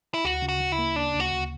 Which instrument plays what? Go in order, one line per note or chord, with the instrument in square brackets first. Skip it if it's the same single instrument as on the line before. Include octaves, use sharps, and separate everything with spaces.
[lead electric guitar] E4
[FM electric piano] D2 [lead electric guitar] F#4
[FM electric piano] C#3
[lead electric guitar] F#4
[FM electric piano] C#3
[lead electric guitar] E4
[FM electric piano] A#3
[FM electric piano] C#3 [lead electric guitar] D4
[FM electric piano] D2
[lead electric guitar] F#4
[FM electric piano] D2